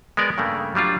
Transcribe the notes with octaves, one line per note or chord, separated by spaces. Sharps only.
G#3 B3 A#4 D5
G2 C#3 A3 A#3
F#3 G3 D4 F4